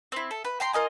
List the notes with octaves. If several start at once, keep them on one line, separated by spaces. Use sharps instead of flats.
C4 E4
A4
B4
G5 A#5 C6
F4 A#4 D#5 G#5